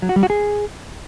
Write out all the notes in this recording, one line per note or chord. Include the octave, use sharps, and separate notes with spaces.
F#3
F#4
G3
F#4
G#4